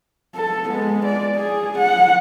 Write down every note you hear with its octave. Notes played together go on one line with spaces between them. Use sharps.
A4
G#3 B3
D5
G#4
F#5